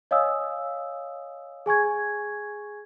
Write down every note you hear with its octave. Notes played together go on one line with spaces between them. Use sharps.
C#5 D#5 F5 G#5 D#6 E6
G#4 G#5 C#6 G#6